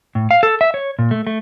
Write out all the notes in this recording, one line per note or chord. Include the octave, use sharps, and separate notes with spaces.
A2
F5
A4
E5
C#5
A#2
A3
A3